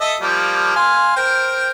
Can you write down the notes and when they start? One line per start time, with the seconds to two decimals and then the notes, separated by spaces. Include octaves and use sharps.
0.01 A4 D#5 E5
0.21 F3 G3 A#3
0.76 F5 G#5 C6
1.17 A#4 C5 G5